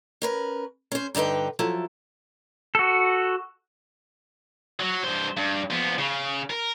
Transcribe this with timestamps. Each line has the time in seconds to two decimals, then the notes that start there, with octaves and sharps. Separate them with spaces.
0.22 C#4 A#4 B4
0.92 C#4 C5
1.15 G2 D3 D#4 B4 G5
1.59 F3 F#3 E4 A4
2.75 F#4 A4
4.80 F#3
5.04 G2 C5
5.37 G2
5.70 F3 B3
5.98 C#3
6.50 A#4